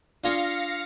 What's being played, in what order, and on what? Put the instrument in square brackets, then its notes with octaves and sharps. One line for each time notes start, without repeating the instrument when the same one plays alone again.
[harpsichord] D4 F4 G#4 [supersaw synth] F5 A#6 C#7